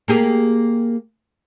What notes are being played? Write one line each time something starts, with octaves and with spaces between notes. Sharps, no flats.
A#3 G4 G#4